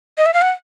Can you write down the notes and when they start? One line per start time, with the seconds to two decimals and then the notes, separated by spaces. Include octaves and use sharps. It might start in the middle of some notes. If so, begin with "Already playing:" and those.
0.18 D#5
0.26 E5
0.34 F5
0.42 F#5